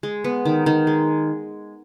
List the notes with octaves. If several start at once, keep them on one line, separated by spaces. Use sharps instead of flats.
G#3
B3
D#3
D#3
G#3